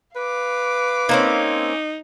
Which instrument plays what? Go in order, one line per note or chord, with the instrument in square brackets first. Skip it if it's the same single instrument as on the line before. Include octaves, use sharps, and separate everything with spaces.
[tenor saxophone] B4 [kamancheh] F5 D6
[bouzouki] A#3 C4 C#4 [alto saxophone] D#4